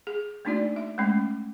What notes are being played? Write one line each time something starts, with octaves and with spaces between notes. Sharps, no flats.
G#4
A3 A#3 D4 D#4 F#4 D5
E5
G#3 A3 C#4